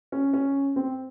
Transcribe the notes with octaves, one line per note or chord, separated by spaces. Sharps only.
C#4
C#4
C4